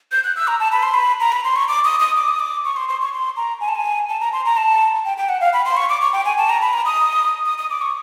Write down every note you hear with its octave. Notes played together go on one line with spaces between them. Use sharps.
G6
F#6
E6
A#5
A5
B5
C6
B5
A#5
B5
C6
C#6
D6
D#6
D#6
D6
D#6
D6
C#6
C6
C6
C#6
C6
A#5
G#5
A5
G#5
A5
A#5
C6
A#5
A5
G5
G5
F#5
F5
B5
C6
C#6
D6
C#6
G5
G#5
A5
A#5
B5
A#5
D#6
D#6
D#6
D6
C#6